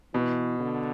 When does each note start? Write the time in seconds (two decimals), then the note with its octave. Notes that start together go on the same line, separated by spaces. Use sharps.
0.14 B2 E3
0.60 D3